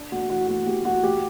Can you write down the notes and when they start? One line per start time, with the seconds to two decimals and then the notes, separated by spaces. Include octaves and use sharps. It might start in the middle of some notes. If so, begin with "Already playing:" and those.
Already playing: D4
0.12 A3 F#4
0.30 E3 F#4
0.48 A3 F#4
0.67 A3 G4
0.85 A3 F#4
1.04 A3 G4